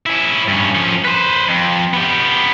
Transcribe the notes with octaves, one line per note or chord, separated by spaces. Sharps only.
C#4 E4
G2 C#4
F3 C#4
B4 C5
F2
B3 G4